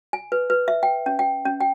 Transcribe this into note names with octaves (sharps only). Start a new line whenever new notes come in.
G#5
B4
B4
E5
G5
C#4
G5
C#4
G5